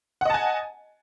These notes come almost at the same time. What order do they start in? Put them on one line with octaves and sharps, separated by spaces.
F#5 D#5 A5 G#5